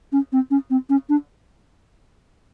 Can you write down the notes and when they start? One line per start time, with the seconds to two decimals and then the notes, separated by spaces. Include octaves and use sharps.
0.12 C#4
0.32 C4
0.51 C#4
0.70 C4
0.89 C#4
1.09 D4